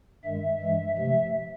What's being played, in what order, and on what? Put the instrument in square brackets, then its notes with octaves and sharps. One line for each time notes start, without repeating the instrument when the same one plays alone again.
[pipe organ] G2 D#3 G#3 E5
G2 E3 G#3
C3 F3 A3 E5